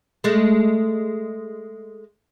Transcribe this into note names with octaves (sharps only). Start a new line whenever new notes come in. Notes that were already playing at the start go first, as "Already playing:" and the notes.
G#3 A3